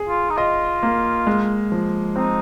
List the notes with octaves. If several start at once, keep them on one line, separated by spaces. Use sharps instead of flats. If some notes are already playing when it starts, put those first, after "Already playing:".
Already playing: G#4
F4
D#4
F4 D#5
A#3
G#3
F3
C4 D#4